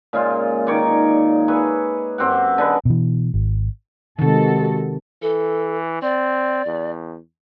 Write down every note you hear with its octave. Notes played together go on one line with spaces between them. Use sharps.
A#2 C#3 G#3 F4
D#3 C#5 D5 D6
G#4 B4 C#5 E5
F#2 C4 G4 F#5
D3 G#4 B4 D#5
B2 E3
G#1
C3 D#3 G#3 F#4 A4
E3 A4
C4 D5
E2